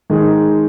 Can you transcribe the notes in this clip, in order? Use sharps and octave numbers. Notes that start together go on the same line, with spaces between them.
D#3 G#3 D#4 G#4